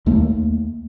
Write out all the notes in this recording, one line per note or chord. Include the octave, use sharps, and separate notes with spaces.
D#2 A3 A#3